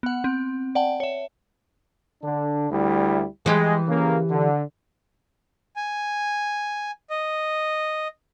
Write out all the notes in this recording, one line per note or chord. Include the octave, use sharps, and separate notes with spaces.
B3 F#5
C4
D5 F#5 G5 A5
C#5 E5
D3 D4
D2 G3 E4
E3 G#3 G4
C#3 A#3
D3
G#5
D#5